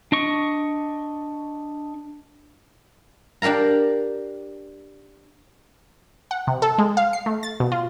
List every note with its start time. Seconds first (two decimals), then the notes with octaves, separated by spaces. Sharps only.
0.12 D4 D#5 C#6
3.42 D4 G4 A#4 F5 A#5
6.31 F#5
6.47 C3
6.62 A4
6.78 G#3
6.97 F5
7.13 C7
7.26 A3
7.43 A6
7.60 B2
7.72 F4